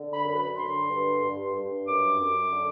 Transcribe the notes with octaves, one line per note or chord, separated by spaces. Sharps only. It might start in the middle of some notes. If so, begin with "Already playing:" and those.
Already playing: D3
B5
F#2
B5
D3 C6
G2
G2
G2
F#2 D6
F#2
D3